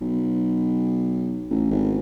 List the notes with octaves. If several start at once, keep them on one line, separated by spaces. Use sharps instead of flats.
B1
A1
G#1